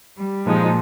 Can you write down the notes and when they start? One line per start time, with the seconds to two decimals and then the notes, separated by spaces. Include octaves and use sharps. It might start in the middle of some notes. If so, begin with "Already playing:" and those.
0.18 G3
0.46 A#2 F3 G#3 D#4